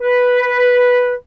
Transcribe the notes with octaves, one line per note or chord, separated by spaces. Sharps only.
B4